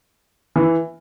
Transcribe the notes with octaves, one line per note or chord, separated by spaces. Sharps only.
E3